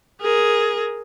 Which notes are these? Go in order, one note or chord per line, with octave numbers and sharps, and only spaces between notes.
G#4 A#4